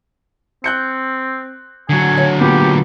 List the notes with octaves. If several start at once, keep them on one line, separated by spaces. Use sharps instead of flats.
C4 F#6 G6 C#7
D3 F#3 G#5
C#5
A#2 B3 G4